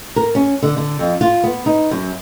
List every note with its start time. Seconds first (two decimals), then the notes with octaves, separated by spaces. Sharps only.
0.16 A#4
0.35 C#4
0.62 D3
0.77 D3
0.99 F2
1.21 F4
1.44 B3
1.66 D#4
1.91 F#2